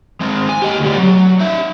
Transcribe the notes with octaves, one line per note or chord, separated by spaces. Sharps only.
G#3 C4
G#5
G4 D#5
D2 G3
F#3
D#4 E5